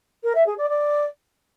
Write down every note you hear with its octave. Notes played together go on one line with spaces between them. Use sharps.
A#4
E5
G#4
D5
D5